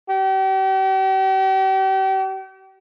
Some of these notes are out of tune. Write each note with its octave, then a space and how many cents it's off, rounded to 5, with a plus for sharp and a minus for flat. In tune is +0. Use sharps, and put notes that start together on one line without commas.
G4 -40